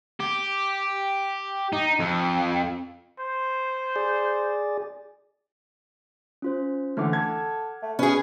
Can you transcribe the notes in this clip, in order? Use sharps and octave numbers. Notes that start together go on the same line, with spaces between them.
G4
D#4
F2
C5
G#4 D5
C#4 F4 C5
D3 E3 A3 F#5 D6 F6
A4 G#6
A3
C#4 G#4 B4